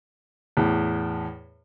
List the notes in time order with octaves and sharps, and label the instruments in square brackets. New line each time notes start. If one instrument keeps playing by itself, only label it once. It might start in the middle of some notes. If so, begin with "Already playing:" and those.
[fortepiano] E2 A2